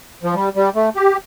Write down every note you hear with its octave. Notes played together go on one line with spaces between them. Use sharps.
F3
G3
G3
A3
G4